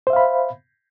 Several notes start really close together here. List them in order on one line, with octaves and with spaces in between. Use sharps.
C5 E5 F5 B5